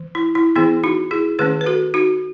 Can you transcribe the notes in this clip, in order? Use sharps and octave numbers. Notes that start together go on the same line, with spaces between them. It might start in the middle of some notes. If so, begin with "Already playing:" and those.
Already playing: E3
E4
E4
E3 B3 E4 G#4
D#4 F#4
E4 G#4
D#3 A3 C#4 G#4 B4
B4
F#4 A4
D#4 F#4